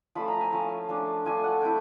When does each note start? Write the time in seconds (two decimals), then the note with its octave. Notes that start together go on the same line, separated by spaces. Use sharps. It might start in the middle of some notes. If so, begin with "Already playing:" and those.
0.15 F3 A3 C#4 B5
0.28 A#5
0.41 G#5
0.52 F3 A3 C#4
0.88 F3 A3 D4
1.25 F3 A3 D4 G#5
1.44 F#5
1.62 A3 C4 E4 G5